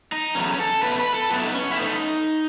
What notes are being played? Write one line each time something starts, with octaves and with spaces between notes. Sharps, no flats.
D#4
E2 C#3 F#3 A3 C#4
A4
B2 A3 B4
B4
A4
A2 F#3 A3 B3
D#4
C#4
E4
B2 A3 D#4